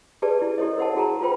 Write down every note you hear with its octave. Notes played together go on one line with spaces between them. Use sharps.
G4 G#4 B4 D5 A5
E4 D5
E4 G4 A4 C#5 D#5
A#4 C5 F#5 A5
E4 F#4 G#4 A5 A#5
F4 B4 C5 G5 B5